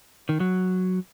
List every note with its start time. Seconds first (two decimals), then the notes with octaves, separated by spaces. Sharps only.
0.29 D#3
0.40 F#3